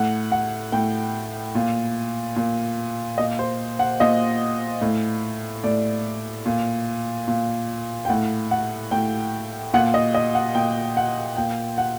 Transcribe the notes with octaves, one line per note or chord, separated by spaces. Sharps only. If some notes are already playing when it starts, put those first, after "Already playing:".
Already playing: A2 F#5
F#5
A2 G5
A#2
A#2
A#2 D#5
C5
F#5
A#2 D#5
A2
A2 D5
A#2
A#2
G5
A2 F#5
F#5
A2 G5
A#2 F#5
D#5
D#5
F#5
A#2 G5
F#5
A#2 G5
F#5